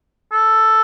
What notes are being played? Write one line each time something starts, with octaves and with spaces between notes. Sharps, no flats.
A4